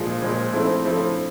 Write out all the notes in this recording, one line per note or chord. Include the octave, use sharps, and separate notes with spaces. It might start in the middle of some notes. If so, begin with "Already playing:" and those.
Already playing: A#2 F3 G#3
A#2 F3 G#3
F3 A3 C4 E4
F3 A3 C4 E4